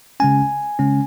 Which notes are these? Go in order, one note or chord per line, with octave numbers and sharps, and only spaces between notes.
C#3 G#3 C#4 G#5
C#3 G#3 C#4